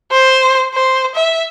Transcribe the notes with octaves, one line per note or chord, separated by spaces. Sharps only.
C5
C5
E5